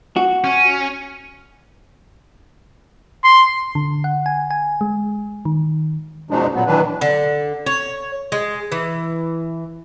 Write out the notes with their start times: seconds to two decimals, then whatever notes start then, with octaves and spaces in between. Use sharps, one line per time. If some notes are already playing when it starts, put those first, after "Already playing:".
0.16 F#4
0.44 C#4
3.24 C6
3.75 D3
4.04 F#5
4.26 G#5
4.51 G#5
4.81 G#3
5.45 D#3
6.31 F#2 B2 F3 G#3 D4 D#4
6.54 A#2 F#3 B3
6.67 D#3 E3 F#3 D4 B4
7.01 D3
7.66 C#5
8.32 G#3
8.72 E3